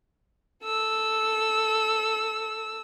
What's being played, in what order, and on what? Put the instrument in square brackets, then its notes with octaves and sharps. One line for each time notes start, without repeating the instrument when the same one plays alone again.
[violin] A4 E6